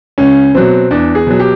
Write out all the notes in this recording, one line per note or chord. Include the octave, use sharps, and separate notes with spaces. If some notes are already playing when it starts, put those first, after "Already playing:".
C#2 C#4
B2 F#3 C4
E2 D4
G#4
B2 F#3
G4